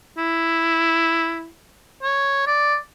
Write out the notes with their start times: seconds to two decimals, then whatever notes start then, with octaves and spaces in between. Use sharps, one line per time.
0.17 E4
2.03 C#5
2.47 D5